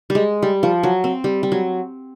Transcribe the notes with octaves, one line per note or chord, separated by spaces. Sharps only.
G3
G#3
G3
F3
F#3
C4
G3
G3
F#3